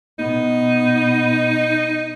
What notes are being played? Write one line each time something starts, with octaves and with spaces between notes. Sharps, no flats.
B2 B3 D#4